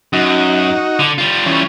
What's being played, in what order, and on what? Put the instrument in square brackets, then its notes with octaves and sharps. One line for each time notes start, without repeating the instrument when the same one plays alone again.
[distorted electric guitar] F#2 [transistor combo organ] D#4 F#4
[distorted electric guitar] D3
G3 F4
[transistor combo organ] E3 C#4